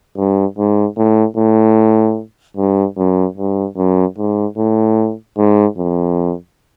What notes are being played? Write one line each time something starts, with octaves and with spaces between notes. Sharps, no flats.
G2
G#2
A2
A2
G2
F#2
G2
F#2
G#2
A2
G#2
F2